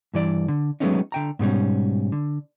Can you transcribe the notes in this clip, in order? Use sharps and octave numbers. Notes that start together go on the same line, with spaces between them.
G2 E3 D5
D3
F#3 G#3 A3 B3 C#4 D#4
D3 G5 A#5
G#2 B2 G3 C#4
D3